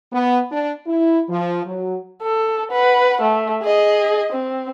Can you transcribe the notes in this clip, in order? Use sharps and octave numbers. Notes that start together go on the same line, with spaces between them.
B3
D4
E4
F3
F#3
A4
B4 F#5
A3
G#4 D#5
C4